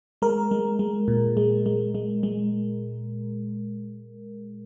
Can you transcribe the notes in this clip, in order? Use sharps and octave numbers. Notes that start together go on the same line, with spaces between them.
G#3 A#4
G#3
G#3
A#2
G#3
G#3
G#3
G#3